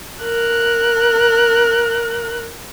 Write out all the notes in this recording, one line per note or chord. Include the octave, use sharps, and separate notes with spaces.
A#4 F#6